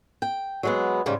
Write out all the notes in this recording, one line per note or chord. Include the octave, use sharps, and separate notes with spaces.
G5
F#3 G#3 B3
G#2 C#3 G3